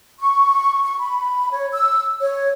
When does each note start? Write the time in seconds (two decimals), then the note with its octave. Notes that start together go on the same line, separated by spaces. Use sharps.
0.20 C#6
0.83 C#6
1.00 B5
1.51 C#5
1.73 E6
2.20 C#5